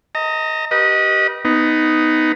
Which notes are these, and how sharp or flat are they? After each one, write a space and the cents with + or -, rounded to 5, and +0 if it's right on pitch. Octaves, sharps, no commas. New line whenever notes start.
D#5 +15 A#5 -35
G4 -20 B4 -30 D#5 +0
B3 +15 D#4 +0